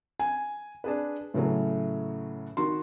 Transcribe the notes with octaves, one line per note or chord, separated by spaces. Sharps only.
G#5
D4 G#4 B4
A2 C#3 E3 F#3 A3
D#3 F#4 C6